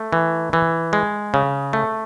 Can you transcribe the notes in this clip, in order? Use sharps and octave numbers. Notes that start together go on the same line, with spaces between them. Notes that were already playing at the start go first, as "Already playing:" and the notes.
Already playing: A3
E3
E3
G#3
C#3
A3